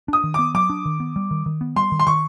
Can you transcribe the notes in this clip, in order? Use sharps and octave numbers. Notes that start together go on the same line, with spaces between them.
D4 D#6
D#3
B3 D6
F#3 D6
D4
D#3
B3
G3
D#3
D#3
B3
G3 C6
D#3
C6
D#3 C#6